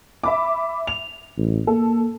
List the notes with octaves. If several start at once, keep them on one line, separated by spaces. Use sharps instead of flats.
E5 B5 D6
F7
A1
A#3 A4